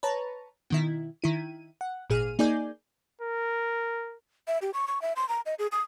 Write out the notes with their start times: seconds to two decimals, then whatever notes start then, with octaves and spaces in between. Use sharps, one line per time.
0.03 B4 C#5 A5 A#5
0.70 B2 D#3 E4
1.22 D#3 E4 D#7
1.81 F#5
2.10 G#1 A#2 G#4 F6 D#7
2.39 A#3 D#4 G#4 D5 G#5 G6
3.21 A#4
4.48 E5
4.62 G4
4.74 C#6
4.88 C#6
5.02 E5
5.16 C6
5.29 A#5
5.46 D#5
5.59 G#4
5.72 D#6